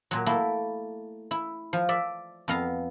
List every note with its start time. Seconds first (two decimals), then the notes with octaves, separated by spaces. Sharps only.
0.11 A#2 F#3
0.26 A3 A#3 E4
1.31 E4
1.73 F3
1.89 D5 E5
2.48 F2 B3 F5 A#5